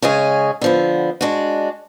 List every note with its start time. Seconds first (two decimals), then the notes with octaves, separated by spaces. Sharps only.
0.02 C#3 G#3 C#4 G#4
0.61 D3 F3 B3
1.21 G#3 D4 F#4